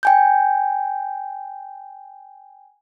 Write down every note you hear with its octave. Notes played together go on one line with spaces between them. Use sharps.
G5 G#5 G6